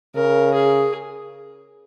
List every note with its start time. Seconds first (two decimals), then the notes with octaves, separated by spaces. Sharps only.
0.16 C#3 A#4
0.54 G#4